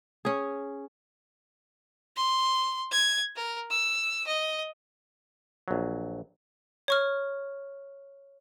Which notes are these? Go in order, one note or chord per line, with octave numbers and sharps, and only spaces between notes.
C#4 G#4
C6
G#6
A#4
E6
D#5
A#1 F#3
C#5 C#6 F6